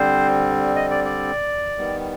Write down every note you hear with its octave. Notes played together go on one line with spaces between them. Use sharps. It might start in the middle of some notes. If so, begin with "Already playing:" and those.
Already playing: D3 G3 C4 C5
D#5
D5
D5
D#3 G3 B3